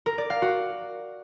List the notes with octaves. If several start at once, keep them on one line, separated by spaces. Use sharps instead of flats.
A#4
D5
F5
F#4